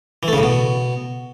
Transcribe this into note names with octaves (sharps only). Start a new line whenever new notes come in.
E3
A3
C#3
A2
B2